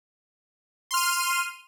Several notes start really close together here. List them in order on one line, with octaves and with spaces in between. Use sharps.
C6 F6 D#7